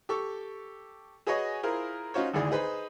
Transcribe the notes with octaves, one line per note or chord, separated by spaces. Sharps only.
G4 A4 C#6
F#4 G#4 B4 C#5 D#5 G#5
E4 F4 G#4 A#4 C5
C#4 D#4 F4 F#4 C5 C#5
G#1 D2 E4 G#4 D5
D#4 G#4 B4 C5 B5